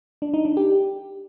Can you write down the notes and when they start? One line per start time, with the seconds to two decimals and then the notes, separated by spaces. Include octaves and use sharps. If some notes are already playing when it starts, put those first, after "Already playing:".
0.22 D4
0.34 D#4
0.45 D4
0.57 G4